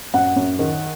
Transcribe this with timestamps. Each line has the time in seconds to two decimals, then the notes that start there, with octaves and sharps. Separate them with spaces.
0.14 F#2 F#5
0.36 F#2
0.59 D#3